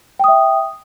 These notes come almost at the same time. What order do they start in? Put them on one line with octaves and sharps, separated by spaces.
G5 D#6 E5